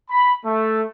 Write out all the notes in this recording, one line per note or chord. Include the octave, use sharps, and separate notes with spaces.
B5
A3